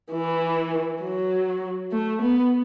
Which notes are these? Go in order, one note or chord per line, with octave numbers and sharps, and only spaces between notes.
E3
F#3
A3
B3